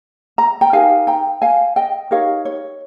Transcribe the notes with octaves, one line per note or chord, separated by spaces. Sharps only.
A#5
G5 A#5
D#4 G4 A#4 F5 G#5
G5 A#5
F5 G#5
D#5 G5
D#4 G4 A#4 C#5 F5
C#5